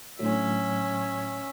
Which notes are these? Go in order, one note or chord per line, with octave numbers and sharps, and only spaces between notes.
A2 D3 F#3 C#4 E5